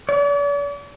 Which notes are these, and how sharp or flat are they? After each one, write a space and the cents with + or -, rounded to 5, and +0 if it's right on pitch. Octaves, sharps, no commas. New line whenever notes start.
D5 -45